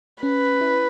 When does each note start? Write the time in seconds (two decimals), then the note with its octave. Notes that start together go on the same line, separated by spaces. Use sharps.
0.23 C#4 B4
0.61 E4